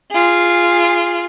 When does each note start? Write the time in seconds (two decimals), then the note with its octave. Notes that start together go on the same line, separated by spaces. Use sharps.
0.12 F4 G#4